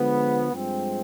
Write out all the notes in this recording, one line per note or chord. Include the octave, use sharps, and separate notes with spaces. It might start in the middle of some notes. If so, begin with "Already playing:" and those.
Already playing: D3 F3 G#3 B3
G2 F3 G#3 C4